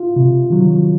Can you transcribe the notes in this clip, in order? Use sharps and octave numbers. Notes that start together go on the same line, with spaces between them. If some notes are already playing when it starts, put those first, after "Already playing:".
Already playing: F4
C3
D#3 F#3